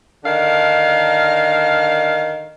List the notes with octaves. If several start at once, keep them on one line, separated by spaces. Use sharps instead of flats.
D3 D#3 D4 F5